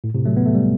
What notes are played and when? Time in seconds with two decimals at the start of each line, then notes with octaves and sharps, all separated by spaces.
0.04 A2
0.15 A2 C3
0.25 F#3 A3
0.37 B3
0.46 A3
0.55 G3